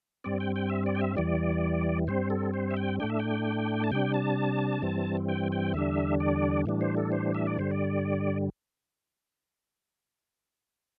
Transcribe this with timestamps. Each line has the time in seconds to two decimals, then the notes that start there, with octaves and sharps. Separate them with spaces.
0.24 G2 G3 C4 D5
0.40 G5
0.56 G5
0.70 E5
0.86 D5
0.95 G5
1.01 E5
1.16 E2 E3 G3 D5
2.07 G2 G3 C4 C5
2.30 A4
2.54 C5
2.71 E5
2.77 G5
3.00 A2 A3 D4 G5
3.10 E5
3.19 G5
3.84 A5
3.91 C3 G3 D4 G5
4.14 A5
4.82 G2 E3 G3 C4
5.28 G5
5.52 G5
5.74 E2 D3 G3 D4 E5
6.20 D5
6.66 A2 E3 G3 D4
6.81 C5
6.97 A4
7.12 C5
7.35 E5
7.47 D5
7.58 G2 D3 G3 C5
7.71 D5